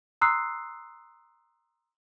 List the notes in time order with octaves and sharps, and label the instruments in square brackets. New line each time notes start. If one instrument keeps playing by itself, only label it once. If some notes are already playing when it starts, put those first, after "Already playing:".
[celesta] A#5 C6 D#6 E6 F#6 C7